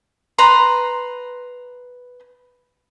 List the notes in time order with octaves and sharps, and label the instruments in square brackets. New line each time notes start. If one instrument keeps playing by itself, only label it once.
[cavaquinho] B4 A#5 C6